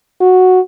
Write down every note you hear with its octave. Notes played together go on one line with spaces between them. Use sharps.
F#4